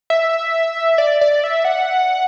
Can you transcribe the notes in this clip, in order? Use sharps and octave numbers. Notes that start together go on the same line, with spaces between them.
E5
D5
D5
E5
F#5